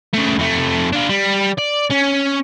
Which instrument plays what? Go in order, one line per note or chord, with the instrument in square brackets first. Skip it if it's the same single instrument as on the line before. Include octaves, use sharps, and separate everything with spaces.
[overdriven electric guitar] C#3 A3
F2 A3
D4 F4
G3
D5
C#4